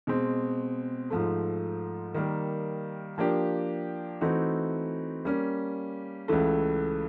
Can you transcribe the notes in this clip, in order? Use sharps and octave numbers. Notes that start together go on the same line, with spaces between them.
B2 G#3 C4
G#2 F3 A3
D#3 G3 A#3
F3 A#3 D4 G4
E3 A3 C4 D#4 F#4
G3 A#3 C#4
C#2 C#3 E3 A3